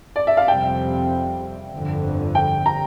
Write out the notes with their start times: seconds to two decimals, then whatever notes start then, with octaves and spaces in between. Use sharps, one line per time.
0.16 D5
0.27 E5
0.37 F5
0.48 F2 C3 G3 C4 G5
1.72 G1 F2 D3
2.35 G5
2.66 A#5